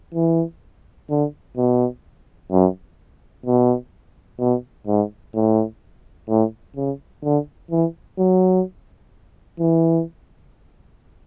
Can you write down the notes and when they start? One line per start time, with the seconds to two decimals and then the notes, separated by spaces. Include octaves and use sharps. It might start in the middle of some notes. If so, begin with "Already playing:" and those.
0.14 E3
1.10 D3
1.57 B2
2.52 F#2
3.46 B2
4.40 B2
4.87 G#2
5.35 A2
6.29 A2
6.77 C#3
7.24 D3
7.71 E3
8.19 F#3
9.60 E3